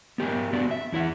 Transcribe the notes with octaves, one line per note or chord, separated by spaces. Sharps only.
B3 G4 A#4 G#5
D3 B3 F#4 D5
E5
E2 E4 E5 F#5